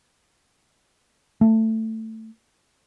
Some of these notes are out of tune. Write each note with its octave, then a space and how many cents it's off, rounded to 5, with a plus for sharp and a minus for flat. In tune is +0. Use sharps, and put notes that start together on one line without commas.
A3 +15